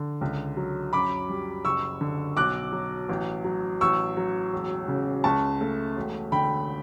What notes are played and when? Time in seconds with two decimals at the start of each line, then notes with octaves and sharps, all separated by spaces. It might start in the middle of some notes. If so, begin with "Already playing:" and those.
Already playing: D3
0.21 C#2
0.57 F#3
0.93 F#2 B5 D6
1.29 G3
1.65 F#1 C#6 E6
2.01 D3
2.36 B1 D6 F#6
2.72 F#3
3.09 A1
3.44 F#3
3.81 A1 C#6 E6
4.17 F#3
4.52 E1
4.88 C#3
5.24 C#2 A5 C#6
5.61 A3
5.96 E1
6.32 D3 G5 B5